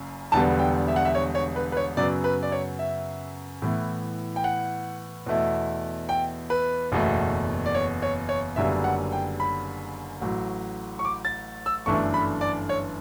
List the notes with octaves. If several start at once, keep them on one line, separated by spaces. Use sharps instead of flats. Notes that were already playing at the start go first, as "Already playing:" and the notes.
Already playing: F#1 F#2 C#3
E1 E2 D3 G3 B3 A5
G5
E5
F#5
E5
C#5
C#5
B4
B4
C#5
F#2 C#3 F#3 B3 D5
B4
D5
C#5
E5
A2 E3 B3
G5
F#5
E2 B2 A3 E4
G5
B4
F#1 E2 B2 A3
D5
C#5
C#5
C#5
F#1 F#2 D3 G3 B3 E5
F#5
G5
B5
A1 A2 F#3
C#6
D6
A6
E6
G1 F#2 E3 A3 D4 C#6
B5
D5
C#5